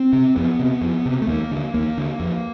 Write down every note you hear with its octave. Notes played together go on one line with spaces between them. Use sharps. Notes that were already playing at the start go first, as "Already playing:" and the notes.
Already playing: C4
C3
F2 B3
C3
F2
C3
A3
D#2 A#3
D3
D#2 A#3
D3
F2